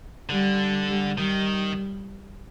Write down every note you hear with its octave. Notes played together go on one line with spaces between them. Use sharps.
D3 G3
G3
D#3 G3